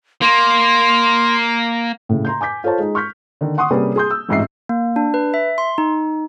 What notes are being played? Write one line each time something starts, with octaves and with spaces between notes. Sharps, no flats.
A#3 C6
A2 C#3
A#5 C6 G6
G#5 D6 G6 B6
F4 A4 C5 C#5 A5
G#3 D#4
C#6 F6 G6 B6
D3 D#3
F#5 C6 C#6 D#6
C3 G3 A#3 C#4 G#4 B4
G#4 C6 G6
E6
A1 F2 G#2 D#5 E5 C7
A#3
D4
B4
E5
C6
D#4